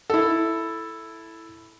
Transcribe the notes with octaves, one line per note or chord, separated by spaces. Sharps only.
E4 A4